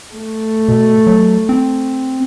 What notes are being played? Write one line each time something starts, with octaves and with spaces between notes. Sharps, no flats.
A3
B2
F#3
C4